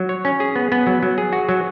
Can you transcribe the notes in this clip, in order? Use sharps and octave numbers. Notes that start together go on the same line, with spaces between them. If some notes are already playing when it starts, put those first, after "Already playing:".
Already playing: F#3
C#5
C#4
G#4
B3
B3
F#3
F#3
G#4
F#4
F#3